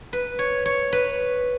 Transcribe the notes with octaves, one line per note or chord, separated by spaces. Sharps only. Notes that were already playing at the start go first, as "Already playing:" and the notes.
B4
C#5
C#5
B4